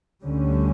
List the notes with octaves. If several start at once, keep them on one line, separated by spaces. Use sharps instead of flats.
D2 D3 G3 C#4